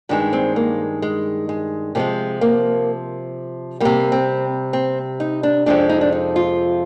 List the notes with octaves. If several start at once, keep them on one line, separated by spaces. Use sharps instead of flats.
G2 D#3 G#3 D4
C4
A#3
G#3
G#3
C3 F3 G#3 A#3
A#3
C3 G3 A#3
C4
C4
D#4
D4
F2 C3 F3 G#3 D4
D#4
D4
D#4
F4